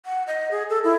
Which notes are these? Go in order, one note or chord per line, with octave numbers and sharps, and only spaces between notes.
F#5
D#5
G#4
A4
E4